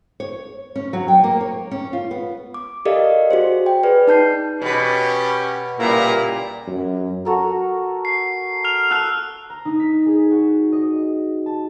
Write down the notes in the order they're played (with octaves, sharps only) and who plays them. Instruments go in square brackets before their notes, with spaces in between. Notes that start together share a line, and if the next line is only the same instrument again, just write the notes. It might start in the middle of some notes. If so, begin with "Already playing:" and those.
[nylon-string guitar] C#5
C#4
F#3
G5
A#3
C#5
C#4
F4
B3
[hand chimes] D6
G4 A4 A#4 D5 D#5 F5
F#4 G#4 C5
G5
G#4 B4 D5
D#4 A5 G6 C7
[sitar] B2 B4 [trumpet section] C#4 G4
[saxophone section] A#2 [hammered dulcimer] C#3 G3 [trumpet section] E4 F4 A#5
[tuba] F#2
[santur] F#4 A4 A#4
[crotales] C7
F6 F7
[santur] A5 [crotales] E6 F#6 F7
[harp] A#5
D#4
B6
G#4
F#4
D#5
A5